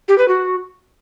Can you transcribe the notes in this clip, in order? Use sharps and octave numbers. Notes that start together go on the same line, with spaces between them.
G4
B4
F#4